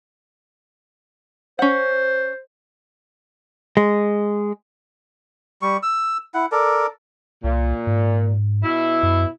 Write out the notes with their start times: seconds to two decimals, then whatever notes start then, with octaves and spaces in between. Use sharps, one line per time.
1.59 C#4 C5 F#5
3.77 G#3
5.62 G3 C#6
5.83 E6
6.34 E4 F#5
6.52 A4 A#4 D5
7.44 C2 A#2
7.87 G#2
8.64 B2 E4
9.03 F#2